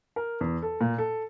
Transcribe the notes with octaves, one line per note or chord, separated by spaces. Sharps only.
A#4
E2
A4
A#2
A4